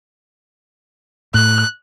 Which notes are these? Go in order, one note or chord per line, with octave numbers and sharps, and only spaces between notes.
A2 F#6